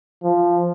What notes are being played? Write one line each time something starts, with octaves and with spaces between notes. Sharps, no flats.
F3